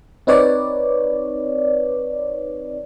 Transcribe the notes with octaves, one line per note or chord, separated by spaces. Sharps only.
C4 D#4 B4 C#5 D5